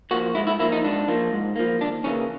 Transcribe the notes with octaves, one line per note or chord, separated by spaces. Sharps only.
F3 A#3 F#4
G#2 E4
E4
F3 A#3 E4
D#4
G#2 D4
F3 A#3
G#2
F3 A#3
D#2 D4
C#3 E3 G3 A#3 C#4